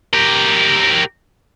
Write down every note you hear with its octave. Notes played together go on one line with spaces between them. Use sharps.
G4 A#4